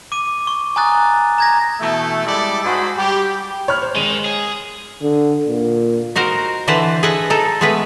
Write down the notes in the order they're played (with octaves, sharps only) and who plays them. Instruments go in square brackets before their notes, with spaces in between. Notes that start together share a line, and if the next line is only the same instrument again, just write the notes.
[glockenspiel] D6 D#7
C#6
G#5 A#5 D#6 F#6 A6
A#5 G#6 A#6
[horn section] B2 E3 A3
G3 G#3 E4 A4 D5
G#2 F#4 G#4 C5 B5
G3 G4
[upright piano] C#5 B5 F6
C5
[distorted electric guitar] D#3 [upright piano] G#3 D#7
[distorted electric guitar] G#4
[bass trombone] D3
A#2
[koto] D#4 F#4 A#4 C5
D3 E3 B4 C5 F#5 A5
G#4 A4 B4 D#5 E5 F#5
D#4 A4
G#3 A3 B3 G#4 B4